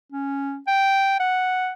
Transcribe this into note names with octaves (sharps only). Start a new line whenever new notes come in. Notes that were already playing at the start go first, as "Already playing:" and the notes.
C#4
G5
F#5